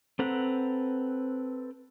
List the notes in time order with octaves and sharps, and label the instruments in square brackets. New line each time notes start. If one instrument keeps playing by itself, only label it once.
[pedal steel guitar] C4 A4 B4 F#5 A#5